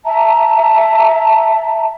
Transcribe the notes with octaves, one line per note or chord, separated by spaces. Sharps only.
E5 A5 A#5